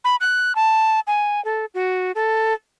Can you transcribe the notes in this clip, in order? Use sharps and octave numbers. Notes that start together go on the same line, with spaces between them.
B5
F#6
A5
G#5
A4
F#4
A4